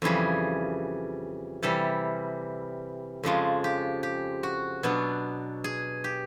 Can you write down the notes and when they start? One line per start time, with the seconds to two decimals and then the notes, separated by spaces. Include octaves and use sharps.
0.02 F2 C#3 E3 G3 G#4
1.63 C3 E3 G3 A4
3.23 F2 C#3 F3 G#3
3.64 G4
4.03 G4
4.43 F#4
4.83 B2 F#3 B3 D4
5.64 G#4
6.04 G4